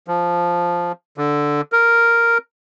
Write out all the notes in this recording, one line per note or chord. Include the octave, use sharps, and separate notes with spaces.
F3
D3
A#4